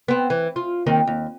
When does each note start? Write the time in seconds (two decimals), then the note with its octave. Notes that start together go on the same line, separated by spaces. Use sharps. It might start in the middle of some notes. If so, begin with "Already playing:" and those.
0.08 B3 C4
0.30 E3
0.56 F4
0.86 D#2 D#3 C4
1.07 D#2